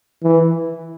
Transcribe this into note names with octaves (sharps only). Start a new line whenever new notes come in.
E3